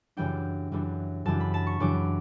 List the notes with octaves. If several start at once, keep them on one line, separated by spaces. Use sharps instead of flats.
F#2 C#3 E3 G3 D4 G5
F#2 C#3 E3 G3 D4
F#2 C#3 E3 G3 D4 A5
B5
A5
C#6
F#2 C#3 E3 G3 D4 D6